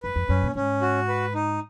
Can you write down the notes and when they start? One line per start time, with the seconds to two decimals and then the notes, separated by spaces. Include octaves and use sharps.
0.03 F#2 B4
0.16 F2
0.29 F#2 C#4
0.43 A#2
0.55 G#2 C#4
0.81 F#4
1.08 B4
1.34 D#4